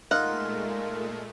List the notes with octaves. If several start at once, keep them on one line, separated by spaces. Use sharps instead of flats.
A#2 G#3 A3 D#4 F4 A#4 F#5